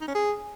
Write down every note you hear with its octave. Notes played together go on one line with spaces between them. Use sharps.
D#4
C#4
G#4